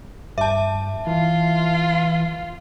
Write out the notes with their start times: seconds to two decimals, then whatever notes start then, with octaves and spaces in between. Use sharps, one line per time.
0.38 G2 E5 A5
1.07 E3 F4